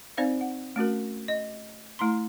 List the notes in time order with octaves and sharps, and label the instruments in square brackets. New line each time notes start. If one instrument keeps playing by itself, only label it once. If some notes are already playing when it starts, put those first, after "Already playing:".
[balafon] C4 D#4 C5 D5 F5
F#5
A3 C#4 F#4 A#4
D#5
A3 E4 A#5 C6